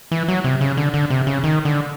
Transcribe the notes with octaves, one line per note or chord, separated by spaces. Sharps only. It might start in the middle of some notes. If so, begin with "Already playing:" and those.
E3
F#3
C3
C#3
D3
D3
C3
C#3
D#3
D3